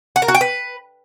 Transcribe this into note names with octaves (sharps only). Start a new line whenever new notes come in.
F#5
A#4
F#4
G5
B4